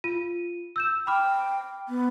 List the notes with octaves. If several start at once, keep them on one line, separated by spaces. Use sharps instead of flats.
F4 D#7
E6 G6 E7
G5 B5 D6 F6
B3